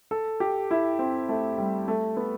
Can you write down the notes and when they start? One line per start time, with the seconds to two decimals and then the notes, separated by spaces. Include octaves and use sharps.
0.11 A4
0.40 G4
0.71 E4
0.99 C4
1.29 A3
1.58 G3
1.88 A3
2.17 B3